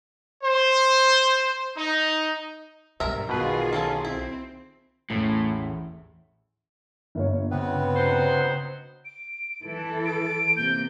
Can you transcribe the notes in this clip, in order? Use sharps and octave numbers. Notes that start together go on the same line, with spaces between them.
C5
D#4
B1 G2 A#4 E5
B2 D#3 F4 G#4 B4
A#3 C#4 A4
C4 E4
A1 E2 A2
G1 A#3 C#5
C#3 B3 C4 B4
F#3 D#4 C5
D7
E3 A4
D7
C3 A#3 G6